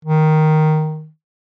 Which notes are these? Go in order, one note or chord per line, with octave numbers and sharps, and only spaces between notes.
D#3